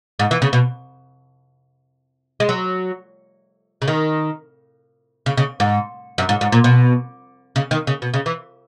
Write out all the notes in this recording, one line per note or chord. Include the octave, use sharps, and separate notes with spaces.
G#2
E3
C#3
B2
G#3
F#3
C#3
D#3
C#3
C#3
G#2
F#2
G#2
G#2
A#2
B2
C#3
D#3
C#3
B2
C#3
E3